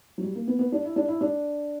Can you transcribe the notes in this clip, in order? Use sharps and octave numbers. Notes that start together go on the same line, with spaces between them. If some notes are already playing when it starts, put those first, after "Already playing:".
F#3
G3
A#3
B3
B3
D4
E4
D4
E4
D4